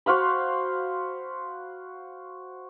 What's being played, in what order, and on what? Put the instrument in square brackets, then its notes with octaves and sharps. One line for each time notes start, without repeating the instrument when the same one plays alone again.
[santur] F#4 C5 F5 B5